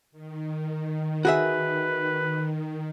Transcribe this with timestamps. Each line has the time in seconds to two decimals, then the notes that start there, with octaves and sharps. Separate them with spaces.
0.12 D#3
1.25 F#4 G#4 B4 E5